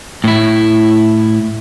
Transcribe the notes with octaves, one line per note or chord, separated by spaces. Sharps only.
A2 E4